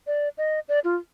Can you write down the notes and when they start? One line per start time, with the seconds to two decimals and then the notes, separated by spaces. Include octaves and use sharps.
0.07 D5
0.38 D#5
0.69 D5
0.84 F4